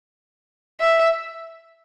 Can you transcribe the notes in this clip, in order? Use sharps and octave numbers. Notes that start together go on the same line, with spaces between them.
E5